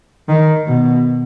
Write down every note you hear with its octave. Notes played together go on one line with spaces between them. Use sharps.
D#3
B2